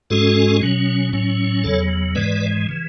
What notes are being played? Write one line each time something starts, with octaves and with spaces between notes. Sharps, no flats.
G#2 G#3 C#4 F#4 A4
B2 F#3 C#4
A2 F#3 C#4
E2 C#3 F#3 A4 C#5
G#2 E3 G#3 B4 D5
C#3 E3